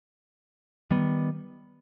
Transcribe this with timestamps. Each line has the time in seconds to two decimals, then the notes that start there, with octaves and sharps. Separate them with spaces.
0.91 D#3 G3 B3